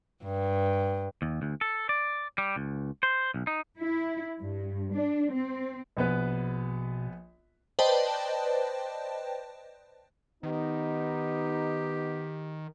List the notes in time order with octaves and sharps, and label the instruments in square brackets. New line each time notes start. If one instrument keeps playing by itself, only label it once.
[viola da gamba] G2
[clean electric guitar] D#2
D2
A4
D5
G3
C#2
C5
B1
D#4
[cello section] E4
G2
D4
C4
[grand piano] A#1 B3 B4 [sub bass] B2
[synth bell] B4 C5 D5 D#5 G5 A5
[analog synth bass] D#3 [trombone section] B3 D#4 [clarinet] G4